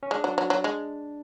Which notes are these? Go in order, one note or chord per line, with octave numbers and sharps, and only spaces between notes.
C#4
G#3 D4
F#3
F#3
F#3
G#3